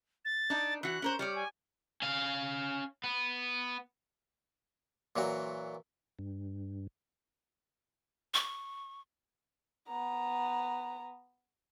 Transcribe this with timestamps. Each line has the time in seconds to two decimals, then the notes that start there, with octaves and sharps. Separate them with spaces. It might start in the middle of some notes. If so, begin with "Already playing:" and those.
0.25 A6
0.50 D4 D#4
0.83 E3 F#4 F#6
1.02 C#4 A#4 C5
1.19 G3 C#5 D5 F6
1.35 G#5
2.02 C#4 F5
3.04 B3
5.16 A#2 E3 F#3 F#4
6.19 G2
8.34 C#6
9.88 B3 A#5